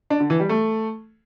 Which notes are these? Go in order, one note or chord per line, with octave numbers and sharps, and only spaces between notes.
D4
D3
E3
G3
A3